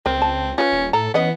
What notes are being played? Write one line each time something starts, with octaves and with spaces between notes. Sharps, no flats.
C#2 C4 A#4
A5
C#4 F4 B4
D#1
A2 A4 A#5
E3 B3 C#4 D#5 F#5